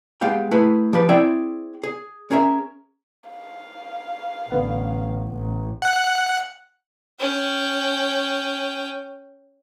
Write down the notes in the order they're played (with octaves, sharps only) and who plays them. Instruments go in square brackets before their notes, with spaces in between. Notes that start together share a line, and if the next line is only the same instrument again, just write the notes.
[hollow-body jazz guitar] G#3 B3 G4 F5 G5
A3 E4 G#4 B4
F3 G4 B4
C4 E4 G#4 D5 E5 G5
G#4
C#4 G#4 A#4 E5
[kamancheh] F5
[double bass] A1 [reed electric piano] D3 B3 F#5
[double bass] A1
[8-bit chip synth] F#5 F#6
[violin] C#4 G5